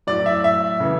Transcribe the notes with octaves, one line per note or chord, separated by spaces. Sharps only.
A2 F#3 D5
E5
E5
C#3 E3